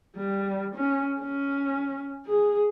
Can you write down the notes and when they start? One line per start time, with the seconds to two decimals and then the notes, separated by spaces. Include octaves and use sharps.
0.16 G3
0.75 C#4
1.21 C#4
2.26 G#4